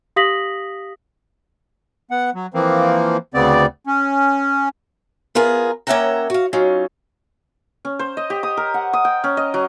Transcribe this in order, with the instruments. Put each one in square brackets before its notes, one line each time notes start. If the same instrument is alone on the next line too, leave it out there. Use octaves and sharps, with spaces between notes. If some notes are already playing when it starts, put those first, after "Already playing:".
[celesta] G4 F5 D#6 A#6 B6 F#7
[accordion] B3 F#5
F#3
E3 F3 A#3 C4
D2 C#3 B3 C4 D5
C#4
[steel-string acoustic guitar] B3 F4 G#4 A#4
A#3 C#4 E5 F#5 G5 A#5
F#4 F5
F#3 C#4 D#4 F4
[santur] C#4
C5
D#5
G4
D#6
A#4
F#5
D#6
G5
C#4
D#5
F#3